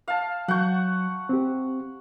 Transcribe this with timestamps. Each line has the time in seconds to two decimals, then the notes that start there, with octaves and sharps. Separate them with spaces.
0.08 F5 A5
0.48 F#3 F#5 C#6 G6
1.29 C4 G4